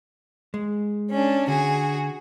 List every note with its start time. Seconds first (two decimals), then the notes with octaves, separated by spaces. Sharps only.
0.54 G#3
1.10 C#4 D4
1.48 D3 F#4 G#4